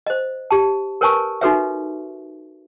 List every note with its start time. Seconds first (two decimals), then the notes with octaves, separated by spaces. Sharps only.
0.07 C5 D#5
0.51 G4 A5
1.01 A#4 B4 C#5 G#5 A5 C#6
1.41 D#4 F#4 A4 B4 C#5 E5